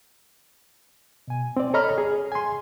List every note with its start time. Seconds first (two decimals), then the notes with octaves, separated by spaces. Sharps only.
1.28 B2 G#5
1.57 C4 D5
1.74 A4 C#5 D#5 A#5 B5 F6
1.98 G#4
2.32 G#5 C6